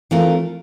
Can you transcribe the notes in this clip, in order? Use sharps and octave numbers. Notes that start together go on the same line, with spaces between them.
E3 A3 C4 F4 A#4